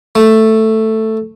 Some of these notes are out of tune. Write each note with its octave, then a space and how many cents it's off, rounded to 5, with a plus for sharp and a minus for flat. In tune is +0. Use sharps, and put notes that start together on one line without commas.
A3 +5